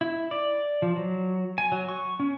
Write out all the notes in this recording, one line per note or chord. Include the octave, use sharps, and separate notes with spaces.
E4
D5
F3
F#3
G#5
F#3
C#6
C#4